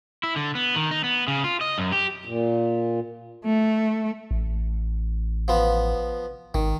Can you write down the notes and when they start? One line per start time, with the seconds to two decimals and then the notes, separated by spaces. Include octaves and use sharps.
0.23 E4
0.36 D3
0.55 B3
0.76 D#3
0.91 D#4
1.04 B3
1.28 C#3
1.44 F4
1.61 D#5
1.78 F#2
1.92 G4
2.25 A#2
3.45 A3
4.31 A1
5.48 F3 B3
6.54 G#1 D#3